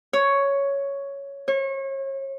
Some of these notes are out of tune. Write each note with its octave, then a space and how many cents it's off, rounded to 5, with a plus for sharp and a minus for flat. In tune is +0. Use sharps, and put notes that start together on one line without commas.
C#5 +5
C#5 -35